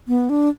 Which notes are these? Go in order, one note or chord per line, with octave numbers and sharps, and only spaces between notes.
B3
D4